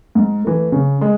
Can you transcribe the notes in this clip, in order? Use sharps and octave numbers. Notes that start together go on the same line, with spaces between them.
G#2
E3 A3
C#3
G#3